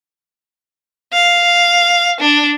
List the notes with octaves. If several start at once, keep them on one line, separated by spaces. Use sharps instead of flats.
F5
D4